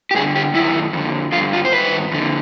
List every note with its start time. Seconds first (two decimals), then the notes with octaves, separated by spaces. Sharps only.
0.11 G4
0.15 G2 D3 G#4
0.35 G4
0.54 F#2 D#3 E4
0.93 F2 D3
1.32 D3 F4
1.36 G2
1.53 F4
1.65 C5
1.72 G2 D#3 B4
2.11 F2 D3